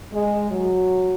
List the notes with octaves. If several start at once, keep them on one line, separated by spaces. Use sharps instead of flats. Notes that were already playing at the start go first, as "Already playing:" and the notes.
G#3
F#3